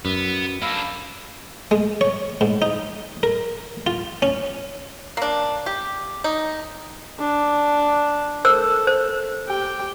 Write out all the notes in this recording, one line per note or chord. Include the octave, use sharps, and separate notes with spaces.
F#2 B3
A#3 D4 F5 B5 E6
G#3
C#5
G#2
D#4
A#4
F4
C#4
A#3 D4
G4
D#4
D4
A4 A#4 C5 E6
C5
G4 G5